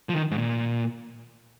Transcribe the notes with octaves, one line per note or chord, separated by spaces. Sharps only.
F3
D#3
G#2
A#2